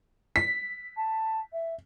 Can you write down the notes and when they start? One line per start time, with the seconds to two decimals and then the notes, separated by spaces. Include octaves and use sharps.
0.36 B6
0.96 A5
1.52 E5